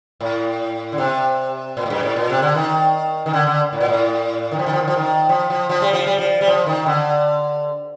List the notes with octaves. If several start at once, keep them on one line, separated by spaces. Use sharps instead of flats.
A2
D3
C3
A#2
A2
G2
A2
A#2
C3
D3
D#3
D#3
D3
D3
A2
A#2
A2
D#3
F3
D#3
F3
D#3
F3
D#3
F3
F3
F3
G3
F3
G3
F3
G3
F3
D#3
D3